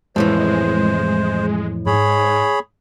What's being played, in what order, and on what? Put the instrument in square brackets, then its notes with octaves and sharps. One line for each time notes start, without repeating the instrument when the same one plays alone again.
[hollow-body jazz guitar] F2 A2 E3 [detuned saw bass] G#3 [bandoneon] C5
[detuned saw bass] G#2 [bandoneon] G#4 C#5 B5